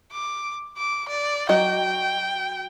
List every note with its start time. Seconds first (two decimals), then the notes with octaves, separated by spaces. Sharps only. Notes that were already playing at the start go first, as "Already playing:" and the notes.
0.12 D6
0.77 D6
1.08 D5
1.49 F#3 F#4 D#5 G5